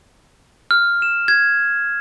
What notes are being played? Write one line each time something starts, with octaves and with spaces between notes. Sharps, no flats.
F6
E7
G#6